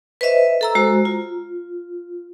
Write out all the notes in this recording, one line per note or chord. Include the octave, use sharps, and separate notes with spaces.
B4 C5 D#5 E5
A4 A#5 E6
G#3 F#4 C5 A#5
F4